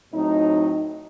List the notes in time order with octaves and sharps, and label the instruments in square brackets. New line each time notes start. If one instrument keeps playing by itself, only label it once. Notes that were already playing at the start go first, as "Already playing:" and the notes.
[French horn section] A2 F#3 C4 D#4